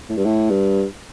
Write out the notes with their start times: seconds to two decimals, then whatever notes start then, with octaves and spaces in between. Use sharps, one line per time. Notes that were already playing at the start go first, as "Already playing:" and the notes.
0.09 A2
0.17 G2
0.25 A2
0.50 G2